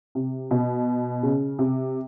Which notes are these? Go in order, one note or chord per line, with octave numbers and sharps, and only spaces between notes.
C3
B2
C#3
C3